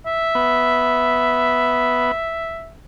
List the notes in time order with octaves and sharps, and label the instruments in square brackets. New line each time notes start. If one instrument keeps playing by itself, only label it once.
[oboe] E5
[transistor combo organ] B3